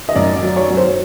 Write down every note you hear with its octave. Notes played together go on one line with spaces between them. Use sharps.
D#5
F#2 D5
D5
F#3
C#5
F#3
C5